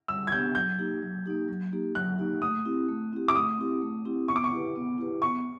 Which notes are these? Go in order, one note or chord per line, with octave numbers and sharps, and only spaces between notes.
G3 E6
G#6
B3 D4 G4 G6
F#3 G6
A#3 D#4 G4
F#3
A#3 D#4 G4
F#3
A#3 D#4 G4
F#3 F#6
A#3 D#4 G4
A3 D#6
C4 E4 G4
A3
C4 E4 G4
D6
A3 D#6
C4 E4 G4
A3
C4 E4 G4
B3 C#6
D6
C#6
E4 G4 B4
B3
E4 G4 B4
B3 C#6